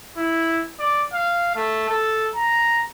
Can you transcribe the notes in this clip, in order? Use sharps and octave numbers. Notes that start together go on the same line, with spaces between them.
E4
D5
F5
A3
A4
A#5